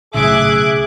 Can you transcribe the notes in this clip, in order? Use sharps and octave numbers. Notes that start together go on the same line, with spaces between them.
B1 A2 C#3 G#4 E5 D6 F#6 G#6